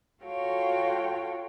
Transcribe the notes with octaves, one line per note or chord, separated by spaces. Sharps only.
F4 F#4 A4 C#5 F5 G5